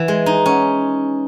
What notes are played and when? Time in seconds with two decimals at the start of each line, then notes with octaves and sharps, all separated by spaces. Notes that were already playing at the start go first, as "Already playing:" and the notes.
Already playing: E3
0.08 G#3
0.26 D#4
0.46 C#4